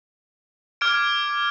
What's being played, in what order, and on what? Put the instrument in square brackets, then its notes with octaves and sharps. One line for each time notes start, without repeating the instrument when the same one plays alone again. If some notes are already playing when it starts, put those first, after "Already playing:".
[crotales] D6 F6 G#6 D7